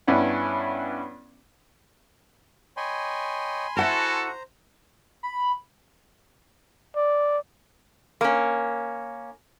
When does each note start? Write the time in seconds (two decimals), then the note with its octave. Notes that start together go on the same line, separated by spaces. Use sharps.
0.07 G2 B3 C#4 D4 E4 F#5
2.77 C#5 D#5 G5 G#5 B5 C6
3.77 E4 F#4 A4 C5 F#5 A5 A#5
5.23 B5
6.96 D5
8.21 A#3 C#4